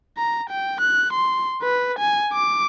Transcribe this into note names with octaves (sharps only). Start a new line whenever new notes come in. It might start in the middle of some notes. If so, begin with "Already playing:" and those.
A#5
G5
F#6
C6
B4
G#5
D6